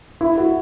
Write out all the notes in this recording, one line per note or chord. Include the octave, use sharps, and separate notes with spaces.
E4
F#4